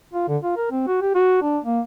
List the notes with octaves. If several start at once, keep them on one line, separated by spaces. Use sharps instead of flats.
F4
D3
F4
A#4
C4
F#4
G4
F#4
D4
A#3